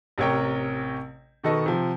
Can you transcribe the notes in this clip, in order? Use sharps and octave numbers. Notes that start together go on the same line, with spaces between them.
A1 C3 A#4 C#5 G5
B2 D#3 A4 B4 D#5 C#6
C3 F3